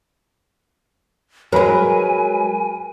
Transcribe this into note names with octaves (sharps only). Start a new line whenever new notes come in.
F#3 G#3 A#4 B4 G#5 B5